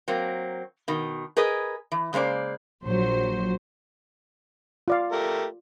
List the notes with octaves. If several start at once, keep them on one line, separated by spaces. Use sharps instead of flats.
F#3 A#3 C4
B2 D#3
G#4 A#4 B4 D#5
E3
C#3 G#3 A#3 C5 D5
A#1 F#3 C5
F4 D5 F5
A3 G4 A#4